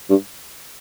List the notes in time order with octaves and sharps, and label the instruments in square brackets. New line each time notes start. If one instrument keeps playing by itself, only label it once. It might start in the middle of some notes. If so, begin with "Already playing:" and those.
[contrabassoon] G2